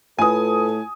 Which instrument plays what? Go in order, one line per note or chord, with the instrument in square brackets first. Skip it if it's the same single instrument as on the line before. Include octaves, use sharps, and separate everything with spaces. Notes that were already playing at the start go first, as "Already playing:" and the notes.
[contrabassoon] A2 [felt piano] F4 B4 [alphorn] A4 [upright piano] G#5 D#6